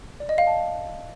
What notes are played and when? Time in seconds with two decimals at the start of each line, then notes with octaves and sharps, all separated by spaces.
0.20 D5
0.29 D#5
0.38 F5
0.47 A5